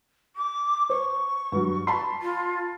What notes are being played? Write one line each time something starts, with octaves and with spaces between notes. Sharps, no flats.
D6
C5 C#6
G2 F#3
A5 B5 C6
F4